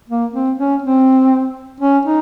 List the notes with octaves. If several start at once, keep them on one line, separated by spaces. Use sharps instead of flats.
A#3
C4
C#4
C4
C#4
D#4